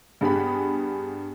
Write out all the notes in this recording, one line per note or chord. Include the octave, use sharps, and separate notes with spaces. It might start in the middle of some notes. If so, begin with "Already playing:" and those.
G2 B3 G4 G#4 B5